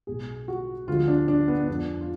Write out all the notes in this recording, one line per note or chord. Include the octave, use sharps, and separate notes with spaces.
B1 B2 G#3 G#4
F#4
D2 D3 F3 G#3 F4
D4
D4
B3
F2 F3 G#3 D4
F4